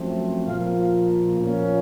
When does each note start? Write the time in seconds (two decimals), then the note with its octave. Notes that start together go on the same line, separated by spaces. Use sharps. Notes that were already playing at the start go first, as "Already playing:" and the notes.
Already playing: F#2 F3 A3 C4
0.46 A#2 F3 A#3 F5
1.39 A#2 F3 A#3 C#4